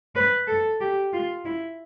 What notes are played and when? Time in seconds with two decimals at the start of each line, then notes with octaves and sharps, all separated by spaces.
0.15 B4
0.47 A4
0.80 G4
1.13 F4
1.45 E4